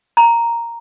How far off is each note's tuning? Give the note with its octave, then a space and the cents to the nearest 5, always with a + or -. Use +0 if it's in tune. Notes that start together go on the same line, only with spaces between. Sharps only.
A#5 +0